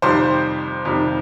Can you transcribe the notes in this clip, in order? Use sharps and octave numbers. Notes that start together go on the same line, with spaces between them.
F2 C3 D#3 G3 C5 C6
F2 C3 D#3 G3